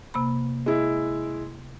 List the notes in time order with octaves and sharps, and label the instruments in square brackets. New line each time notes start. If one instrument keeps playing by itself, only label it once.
[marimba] C3 A#3 B5
[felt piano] G#3 E4